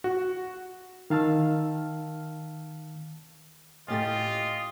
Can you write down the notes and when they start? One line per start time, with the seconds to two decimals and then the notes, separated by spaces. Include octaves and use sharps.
0.04 F#4
1.10 D#3 F5 A5 E6 F6
3.88 A2 C#4 F4 G4 D#5 A6